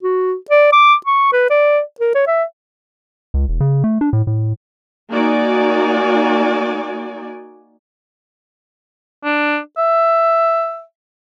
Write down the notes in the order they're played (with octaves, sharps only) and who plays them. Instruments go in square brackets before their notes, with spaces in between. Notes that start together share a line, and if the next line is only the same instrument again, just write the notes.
[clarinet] F#4
D5
D6
C#6
B4
D5
A#4
C#5
E5
[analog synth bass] C#2
E1
C#3
A3
D4
A2
A2
[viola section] A#3 D#4 F#4 D5 G#5
[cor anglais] D4
E5